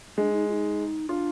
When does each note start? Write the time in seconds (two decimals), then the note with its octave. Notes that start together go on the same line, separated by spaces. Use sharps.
0.17 G#3 D4
0.33 D#4
0.49 F4
0.53 D#4
1.09 D4 F4